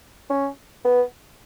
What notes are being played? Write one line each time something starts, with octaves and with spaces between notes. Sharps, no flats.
C#4
B3